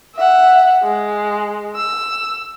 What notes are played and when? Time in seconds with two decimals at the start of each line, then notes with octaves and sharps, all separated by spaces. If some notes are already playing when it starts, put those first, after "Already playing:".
0.16 E5 F#5
0.83 G#3
1.76 E6